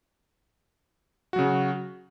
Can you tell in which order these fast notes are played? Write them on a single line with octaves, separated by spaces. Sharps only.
F#4 F#3 C#3